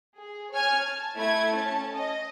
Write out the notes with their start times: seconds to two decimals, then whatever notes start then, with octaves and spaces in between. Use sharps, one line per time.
0.17 G#4
0.54 C#5 G#5 F6 G#6
0.84 A5
1.17 A3 E4 G#6
1.53 C#4 A5
1.95 D#5